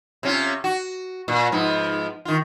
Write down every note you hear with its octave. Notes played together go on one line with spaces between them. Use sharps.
C3 C#4 F4
F#4
A#2
G#2 F3 B3
D#3 F4